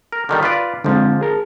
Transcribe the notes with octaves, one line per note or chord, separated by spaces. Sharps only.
A#4
D3 D#3 G3
F4 B4 D5
G#2 D3 F3 G#3 C4
G#4 A#4 A5